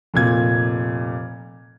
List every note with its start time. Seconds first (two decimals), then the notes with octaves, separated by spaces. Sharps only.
0.14 F1 A#2 G#6